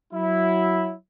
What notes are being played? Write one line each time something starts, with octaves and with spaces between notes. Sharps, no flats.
F#3 E4